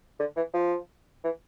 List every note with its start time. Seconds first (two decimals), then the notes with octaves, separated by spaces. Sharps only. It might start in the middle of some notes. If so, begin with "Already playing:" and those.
0.20 D3
0.36 E3
0.54 F3
1.24 E3